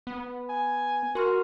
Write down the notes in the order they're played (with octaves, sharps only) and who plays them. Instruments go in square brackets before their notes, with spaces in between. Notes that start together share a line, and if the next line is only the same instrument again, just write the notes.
[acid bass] B3
[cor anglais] G#5
[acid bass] F#4 [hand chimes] A#4 C6 F6